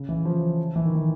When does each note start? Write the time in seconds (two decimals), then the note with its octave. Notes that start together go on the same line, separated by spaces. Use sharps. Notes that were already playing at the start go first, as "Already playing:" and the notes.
Already playing: C#3
0.09 E3
0.25 F3
0.76 E3
0.85 D#3
0.95 E3